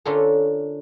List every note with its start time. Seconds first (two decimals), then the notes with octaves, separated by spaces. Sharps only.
0.05 D3 C#4 D4 F4 A4 A#4